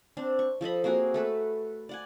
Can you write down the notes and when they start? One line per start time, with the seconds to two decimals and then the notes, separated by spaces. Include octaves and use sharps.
0.17 C4 D4
0.39 C#6
0.61 F3 A4 D#5 B5
0.84 A#3 C4 F#4 G#4
1.14 A3 A4 B4
1.89 D5 F#5 G#5